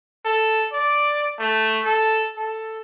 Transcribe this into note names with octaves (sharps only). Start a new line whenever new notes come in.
A4
D5
A3
A4
A4